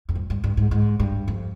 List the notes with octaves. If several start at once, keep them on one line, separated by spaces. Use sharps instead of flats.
F2
G2
G2
G2
G#2
G#2
G2
F2